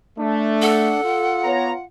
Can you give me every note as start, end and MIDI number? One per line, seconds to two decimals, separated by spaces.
0.19 0.94 57
0.19 1.00 62
0.62 1.46 69
0.62 1.85 78
1.04 1.86 65
1.44 1.71 59
1.44 1.71 73
1.44 1.71 82